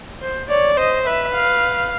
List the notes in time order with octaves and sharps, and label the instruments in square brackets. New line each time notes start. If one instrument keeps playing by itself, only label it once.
[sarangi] C5
[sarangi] C#5 [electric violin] D5
[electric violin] C5 [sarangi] D#5
[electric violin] B4 [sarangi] E5
[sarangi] F5